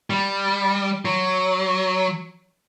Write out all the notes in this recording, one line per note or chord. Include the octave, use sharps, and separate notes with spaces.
G3
F#3